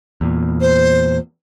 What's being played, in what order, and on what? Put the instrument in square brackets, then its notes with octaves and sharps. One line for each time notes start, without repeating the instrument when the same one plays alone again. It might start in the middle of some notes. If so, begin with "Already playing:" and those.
[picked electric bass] E2 A#2
[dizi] C5